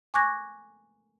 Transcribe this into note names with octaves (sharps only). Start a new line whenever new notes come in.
G#5 C#6 D6 F#6 G#6 A#6